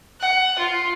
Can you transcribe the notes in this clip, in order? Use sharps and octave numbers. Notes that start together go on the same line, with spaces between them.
F#5
F4